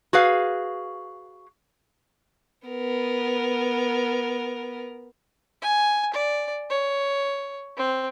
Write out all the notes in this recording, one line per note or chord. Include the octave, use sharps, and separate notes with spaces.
F#4 G#4 B4 F5
B3 A#4
G#5
D5
C#5
C4